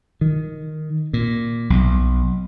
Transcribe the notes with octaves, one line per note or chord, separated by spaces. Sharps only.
D#3
A#2
B1